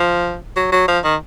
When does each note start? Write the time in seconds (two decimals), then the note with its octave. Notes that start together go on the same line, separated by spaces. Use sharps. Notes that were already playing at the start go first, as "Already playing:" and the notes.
Already playing: F3
0.56 F#3
0.72 F#3
0.88 F3
1.04 D#3